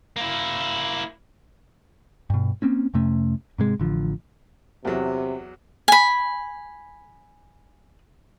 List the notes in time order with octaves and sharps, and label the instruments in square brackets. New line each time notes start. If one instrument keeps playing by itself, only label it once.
[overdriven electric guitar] A#3 E4
[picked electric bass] G2 B2
A#3 C4 C#4
F2 C3 A3 C#4
G#2 C3 G#3
A1 D3 F3
[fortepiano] E2 F#3 [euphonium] C3
[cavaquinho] G#5 B5